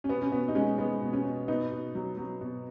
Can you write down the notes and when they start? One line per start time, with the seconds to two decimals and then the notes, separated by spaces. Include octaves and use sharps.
0.04 C#4
0.09 B2 B3
0.22 C#4
0.32 B2 B3
0.48 D#4
0.55 G#3 C#4
0.78 G#3 B3
1.01 B2
1.13 C#4
1.25 B2
1.48 B2 B3 D#4
1.72 B2
1.95 F#3
2.17 F#3
2.41 B2